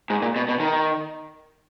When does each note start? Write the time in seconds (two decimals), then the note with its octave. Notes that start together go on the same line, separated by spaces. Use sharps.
0.10 G#2
0.22 A#2
0.36 B2
0.49 B2
0.60 D#3